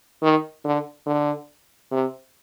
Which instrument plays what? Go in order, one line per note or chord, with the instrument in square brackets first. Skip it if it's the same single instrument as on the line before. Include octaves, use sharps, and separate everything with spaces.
[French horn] D#3
D3
D3
C3